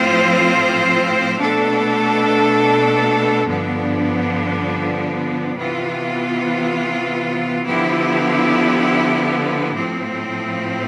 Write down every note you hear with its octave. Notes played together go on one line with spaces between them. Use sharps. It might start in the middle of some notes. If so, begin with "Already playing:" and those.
Already playing: A2 F3 C4 F4 C5
B2 A3 D4 A4
G2 D3 F3 B3 D4
C3 E3 B3 F4
D3 F3 B3 E4 G4
A2 F3 C4